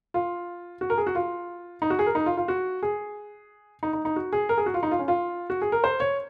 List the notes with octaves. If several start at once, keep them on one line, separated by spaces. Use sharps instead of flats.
F4
F#4
A#4
G#4
F#4
F4
D#4
F#4
G#4
A#4
D#4
F4
F4
F#4
G#4
D#4
D#4
D#4
F#4
G#4
A#4
G#4
F#4
F4
D#4
F4
C#4
F4
F#4
G#4
A#4
C5
C#5